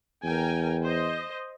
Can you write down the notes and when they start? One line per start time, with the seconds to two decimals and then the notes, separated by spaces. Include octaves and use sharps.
0.24 E2 A#4 G5 G#5
0.82 C5 D#5